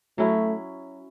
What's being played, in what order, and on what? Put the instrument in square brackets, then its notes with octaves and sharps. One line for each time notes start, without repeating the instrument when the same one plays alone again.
[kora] F#3 C#4 E4 [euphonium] A3